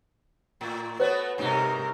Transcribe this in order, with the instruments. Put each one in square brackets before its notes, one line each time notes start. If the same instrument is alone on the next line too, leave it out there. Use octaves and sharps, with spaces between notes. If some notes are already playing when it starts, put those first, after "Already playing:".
[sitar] A2
[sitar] A3 B3 F#4 [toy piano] B4 C#5
[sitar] G2 D#4 [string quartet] C3 A#4